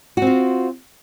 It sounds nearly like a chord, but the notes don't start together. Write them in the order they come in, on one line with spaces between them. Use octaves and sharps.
F#4 C4 F4